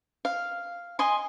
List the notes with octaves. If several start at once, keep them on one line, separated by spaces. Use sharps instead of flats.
F5
D#5 G#5 C6